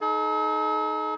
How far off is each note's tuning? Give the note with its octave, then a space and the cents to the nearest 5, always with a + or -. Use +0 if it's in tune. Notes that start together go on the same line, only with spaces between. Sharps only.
D#4 +0 A4 -45